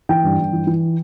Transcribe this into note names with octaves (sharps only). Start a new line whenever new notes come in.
E3 G5
G2
G2
E3
E3